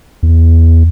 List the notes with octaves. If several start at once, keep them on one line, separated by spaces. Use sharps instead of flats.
E2